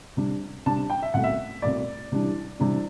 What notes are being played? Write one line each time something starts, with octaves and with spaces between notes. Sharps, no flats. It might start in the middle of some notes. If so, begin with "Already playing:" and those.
C3 G3 D4
C3 G3 D4 A5
G5
E5
C2 B2 A3 F#5
E5
C2 B2 A3 D5
C3 E3 G3 D4
C3 E3 G3 D4